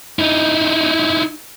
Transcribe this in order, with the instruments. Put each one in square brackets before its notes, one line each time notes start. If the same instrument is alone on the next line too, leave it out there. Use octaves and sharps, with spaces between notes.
[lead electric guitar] D#4 E4